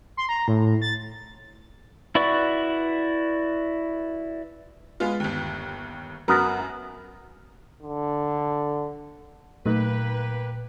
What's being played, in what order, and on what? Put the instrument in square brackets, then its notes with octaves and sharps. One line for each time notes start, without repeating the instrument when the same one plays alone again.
[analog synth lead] C6
A#5
A2
A6
[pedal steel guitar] E4 F#4 B4 D5 C#6
[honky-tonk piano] G#3 B3 F4
G1 D#2
[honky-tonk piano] F#2 F#3 [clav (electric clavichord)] B3 A#4
[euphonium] D3
[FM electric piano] A#2 [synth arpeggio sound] F#3 A3 D#4 [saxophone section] A#3 G4 B4